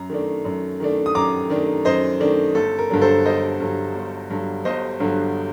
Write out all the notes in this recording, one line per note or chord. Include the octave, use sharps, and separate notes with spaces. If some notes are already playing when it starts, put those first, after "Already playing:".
Already playing: F#2 A#5
D#3 A3 D4
F#2
D#3 A3 D4
D#6
F#2 A#5 D6
D#3 A3 D4
F#2 C5 D#5
D#3 A3 D4
G1 A4
A#4
G2 D3 F#3
A4 C5
G1 C5 D#5
G2 D3 F#3
G1
G2 D3 F#3
G1 C5 D#5
G2 D3 F#3